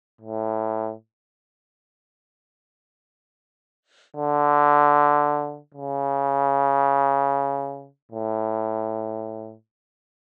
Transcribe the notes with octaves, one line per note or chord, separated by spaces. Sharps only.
A2
D3
C#3
A2